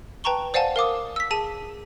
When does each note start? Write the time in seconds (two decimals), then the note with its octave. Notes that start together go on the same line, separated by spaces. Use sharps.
0.24 B4 G5 A5 A#5 C#6 G7
0.54 C5 D5 F5 F#5 G#5 A5
0.76 A#4 F5 D6 D#6
1.16 E6 B6
1.31 G#4 A5 D#7